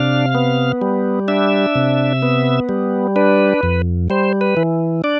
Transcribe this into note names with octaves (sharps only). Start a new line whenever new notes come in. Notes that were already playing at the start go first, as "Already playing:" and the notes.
Already playing: C3 D4 F5
B3
G3
D4 E5
C3
B3
G3
D4 B4
F2
G3 C5
B4
E3
D4 D5